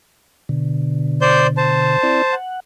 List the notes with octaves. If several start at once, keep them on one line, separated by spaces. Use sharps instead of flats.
B2 D3
C5 D5 G6
C5 A5
C4 E4 D5
F#5